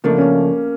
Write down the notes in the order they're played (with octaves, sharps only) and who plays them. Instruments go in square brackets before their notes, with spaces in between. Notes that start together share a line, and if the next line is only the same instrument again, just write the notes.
[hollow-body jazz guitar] C#3 F3 A3 D4 [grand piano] A#3
[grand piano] C#4